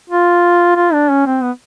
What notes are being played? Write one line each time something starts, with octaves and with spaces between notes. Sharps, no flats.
F4
F4
D4
C#4
C4
B3